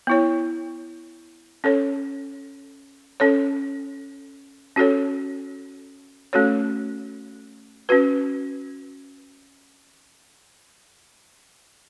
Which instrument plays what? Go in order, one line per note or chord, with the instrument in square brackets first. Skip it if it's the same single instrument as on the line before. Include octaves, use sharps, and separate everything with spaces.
[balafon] B3 E4 C#5
C#4 A4 C#5
C#4 A4 C#5
C#4 F#4 A4 C#5
A3 C#4 F#4 A4 C#5
C#4 F#4 B4